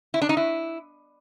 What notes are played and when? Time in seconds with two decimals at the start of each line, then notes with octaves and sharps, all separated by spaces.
0.14 E4
0.22 D4
0.29 D#4
0.37 E4